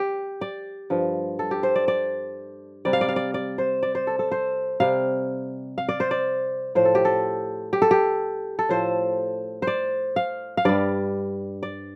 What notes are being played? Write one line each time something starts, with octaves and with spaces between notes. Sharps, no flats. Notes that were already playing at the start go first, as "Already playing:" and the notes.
Already playing: G4
D5
G2 F3
A4
G4
C5
D5
D5
C3 G3 D5
F5
D5
F5
D5
D5
C5
D5
C5
A4
A4
C5
C3 G3 F5
F5
D5
C5
D5
A2 F3 C5
A4
G4
A4
G4
A4
G4
A4
A2 F3 C5
C5
D5
F5
F5
G2 G3 D5
D5